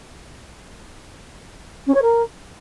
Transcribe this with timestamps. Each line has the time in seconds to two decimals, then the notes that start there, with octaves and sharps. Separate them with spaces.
1.87 C#4
1.95 C#5
2.02 A#4